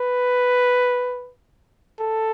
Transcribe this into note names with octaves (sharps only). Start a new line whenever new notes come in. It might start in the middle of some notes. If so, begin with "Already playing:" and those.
Already playing: B4
A4